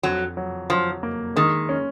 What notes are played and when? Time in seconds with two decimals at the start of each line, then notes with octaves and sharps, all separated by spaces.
0.03 F2 F#3
0.37 F#3
0.70 F3 F#3
1.03 A#3
1.36 D#3 G#3
1.69 C#4